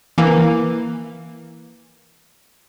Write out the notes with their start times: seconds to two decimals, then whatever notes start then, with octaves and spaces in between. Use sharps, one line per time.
0.18 E3 A#3